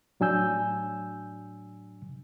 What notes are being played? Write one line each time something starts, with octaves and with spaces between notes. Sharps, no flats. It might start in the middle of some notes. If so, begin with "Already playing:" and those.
A2 F#3 D4 G#5 E6 G6